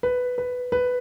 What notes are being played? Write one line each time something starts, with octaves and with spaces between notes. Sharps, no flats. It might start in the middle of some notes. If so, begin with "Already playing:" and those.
B4
B4
B4